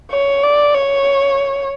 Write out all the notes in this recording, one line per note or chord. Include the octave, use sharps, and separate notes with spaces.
C#5
D5
C#5